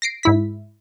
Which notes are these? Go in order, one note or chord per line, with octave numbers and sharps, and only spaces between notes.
A#6 C7 D7
G#2 E4 B6